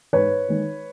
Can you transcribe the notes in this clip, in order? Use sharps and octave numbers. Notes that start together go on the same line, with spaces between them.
G#2 B4 C#5
D#3 G#3